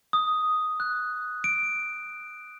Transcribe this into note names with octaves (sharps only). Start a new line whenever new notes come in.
D#6
F#6
D7